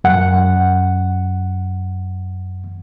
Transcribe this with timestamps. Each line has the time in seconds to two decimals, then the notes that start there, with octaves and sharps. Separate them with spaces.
0.04 F#2 F#5